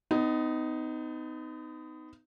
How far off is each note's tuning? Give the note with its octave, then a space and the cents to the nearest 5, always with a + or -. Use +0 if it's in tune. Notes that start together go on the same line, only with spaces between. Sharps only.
B3 +40 D#4 +0